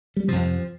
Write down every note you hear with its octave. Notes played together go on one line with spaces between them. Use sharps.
G3
F2 C3 F3